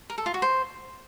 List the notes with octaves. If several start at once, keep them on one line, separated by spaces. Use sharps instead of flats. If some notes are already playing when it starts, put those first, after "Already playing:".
A#4
A4
F4
F#4
C5